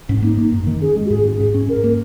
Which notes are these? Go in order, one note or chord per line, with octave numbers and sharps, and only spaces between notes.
G#2 C#4
A#3 D#4
A#3
F#2
D#3
C#4 G#4
G#3
F#4
G#2 G#4
C#4
G#2
C#4
G#2 A#4
A#3